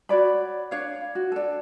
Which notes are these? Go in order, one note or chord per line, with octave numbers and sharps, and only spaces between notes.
F#4 C#5 D5 B5
D4 C#5 F5
F#4
D4 A4